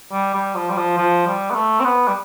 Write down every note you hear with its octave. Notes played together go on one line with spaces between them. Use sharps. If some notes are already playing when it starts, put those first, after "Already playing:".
G3
G3
F3
G3
F3
F3
G3
B3
A3
C4
B3
G3